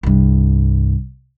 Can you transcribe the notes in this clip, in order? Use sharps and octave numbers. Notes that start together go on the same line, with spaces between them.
C2 G2